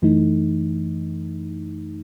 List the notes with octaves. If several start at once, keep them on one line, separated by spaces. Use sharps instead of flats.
F#2 E3 A3 D#4